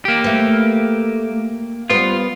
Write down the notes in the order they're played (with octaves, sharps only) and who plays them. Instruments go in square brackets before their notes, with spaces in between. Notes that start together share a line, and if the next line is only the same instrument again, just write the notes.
[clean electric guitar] A#3 G4
[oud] A3 B4
[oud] G3 B3 B4 [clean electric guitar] F4